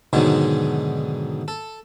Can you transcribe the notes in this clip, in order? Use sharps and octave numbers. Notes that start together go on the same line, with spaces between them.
G#2 B2 D3 D#3 F#3 G#3
A4